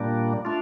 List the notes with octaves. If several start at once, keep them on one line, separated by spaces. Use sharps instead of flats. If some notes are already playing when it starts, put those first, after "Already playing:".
Already playing: A#2 G3 A#3 D4
A3 D4 F4